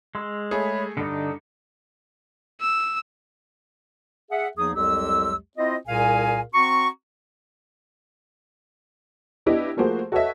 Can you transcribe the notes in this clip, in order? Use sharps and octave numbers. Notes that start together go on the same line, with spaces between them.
G#3 C6 E6
A3 G#4 C#5 E5 B5
G2 D3 D4 D#4 D#5 D#6
E6
G#4 E5 F#5
E2 F3 A#3 D#4 G#4 D#6
C2 F2 F#3 G#3 G4 E6
C4 E4 F4 C5 D#5
C2 A#2 G#4 A#4 F5 G#5
C4 F#4 A#5 C#6
B3 D4 E4 G4 D#5
F3 A3 A#3 F#4 G#4 C5
F#4 A4 B4 C#5 D#5 E5